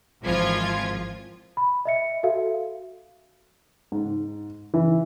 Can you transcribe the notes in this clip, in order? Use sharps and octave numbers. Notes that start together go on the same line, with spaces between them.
G#1 E3 F3 F4 G#6
B5
D#5 E5 C#7
F#4 A4 E5 F5
G#2
E3